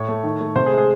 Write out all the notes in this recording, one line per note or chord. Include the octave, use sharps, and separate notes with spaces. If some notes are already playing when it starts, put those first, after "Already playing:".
Already playing: A2 C#5
A3
D#3
A3
C3 C5
G#4
G#3
G#4